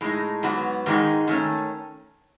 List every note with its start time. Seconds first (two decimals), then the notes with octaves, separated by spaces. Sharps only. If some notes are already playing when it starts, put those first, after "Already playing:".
0.01 A2 G#3 D#4
0.43 G#2 F#3 B3 F#4
0.86 G#2 D#3 G#3 D#4
1.28 D#3 A3 C#4